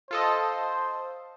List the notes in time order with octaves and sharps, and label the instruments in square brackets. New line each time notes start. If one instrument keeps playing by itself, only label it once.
[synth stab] F4 A4 D#5 [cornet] C5